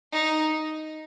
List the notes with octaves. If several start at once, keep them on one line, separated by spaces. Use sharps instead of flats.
D#4